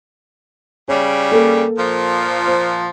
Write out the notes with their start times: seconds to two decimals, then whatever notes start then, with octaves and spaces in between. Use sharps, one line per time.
0.88 C#3 G3 C#5
1.32 A#3 A4
1.77 A#2 F3
2.47 C5